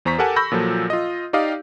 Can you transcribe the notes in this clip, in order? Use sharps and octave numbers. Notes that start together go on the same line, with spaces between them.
E2 C5 A#5 C#6 B6
G4 A4 A#4 F#5 G#5 A5
B5 C#6 E6 G6 A#6
A#2 F3 F#3 A4
F4 D#5
D#4 G4 D5 D#5 F5